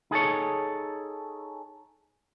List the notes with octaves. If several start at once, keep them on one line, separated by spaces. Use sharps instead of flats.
D#4 G#4 A4 C#5